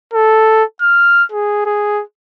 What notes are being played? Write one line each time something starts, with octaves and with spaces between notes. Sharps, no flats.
A4
F6
G#4
G#4